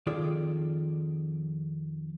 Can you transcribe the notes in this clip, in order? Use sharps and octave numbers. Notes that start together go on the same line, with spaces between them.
F2 D#3 F4 G#4 A4 D5